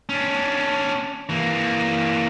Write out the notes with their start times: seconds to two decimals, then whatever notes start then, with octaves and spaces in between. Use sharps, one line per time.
0.09 C#4 D4
1.29 E3 A#3